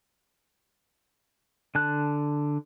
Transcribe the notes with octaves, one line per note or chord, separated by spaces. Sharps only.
D3 A5 F#6